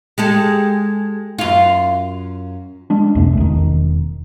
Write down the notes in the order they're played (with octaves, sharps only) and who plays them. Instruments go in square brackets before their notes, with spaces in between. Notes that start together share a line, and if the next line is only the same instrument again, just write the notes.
[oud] G#3 G4 A4
F#2 F4
[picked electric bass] G#3 D4
B1 F2 C3 A3
E1 D#3